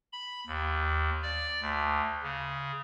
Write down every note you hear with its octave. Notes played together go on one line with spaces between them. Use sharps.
B5
D#2
D5
D2
C#3